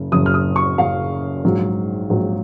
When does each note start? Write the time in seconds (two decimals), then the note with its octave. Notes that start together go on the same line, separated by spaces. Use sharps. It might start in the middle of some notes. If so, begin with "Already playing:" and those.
Already playing: F#1 C#3
0.12 F#1 F#2 C#3 D#6
0.26 F6
0.34 D#6
0.56 C#6
0.78 F#1 F#2 C#3 F5
1.44 A#1 G#2 F#3
2.10 A#1 G#2 F#3